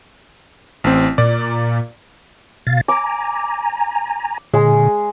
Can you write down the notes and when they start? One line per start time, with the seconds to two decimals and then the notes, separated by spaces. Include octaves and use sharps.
0.84 A1 C4
1.18 A#2 D5
2.67 B2 F5 A6
2.88 G#5 A#5 D6
4.54 A#2 D3 G#3